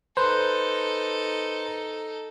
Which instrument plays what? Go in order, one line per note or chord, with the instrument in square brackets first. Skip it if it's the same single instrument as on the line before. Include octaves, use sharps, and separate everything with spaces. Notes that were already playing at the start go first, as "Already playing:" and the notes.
[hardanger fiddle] D#4 A4 [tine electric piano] B4 C5